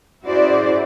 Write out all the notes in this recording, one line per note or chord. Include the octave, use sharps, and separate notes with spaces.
C#4 E4 F#4 G#4 C5 D5